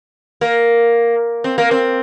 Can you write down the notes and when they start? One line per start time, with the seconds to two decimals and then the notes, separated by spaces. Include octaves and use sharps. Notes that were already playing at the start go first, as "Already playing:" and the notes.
0.41 A#3
1.44 C4
1.58 A#3
1.71 C4